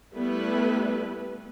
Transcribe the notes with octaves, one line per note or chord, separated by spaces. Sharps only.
G3 A3 B3 E4 B4